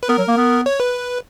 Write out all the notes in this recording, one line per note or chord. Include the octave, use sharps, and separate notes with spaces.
B4
B3 A#4
F#3
A#3
B3
C#5
B4